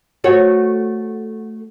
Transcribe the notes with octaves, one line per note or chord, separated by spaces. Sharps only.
A3 F#4 C#5